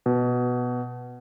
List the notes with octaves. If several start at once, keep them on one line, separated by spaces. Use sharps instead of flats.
B2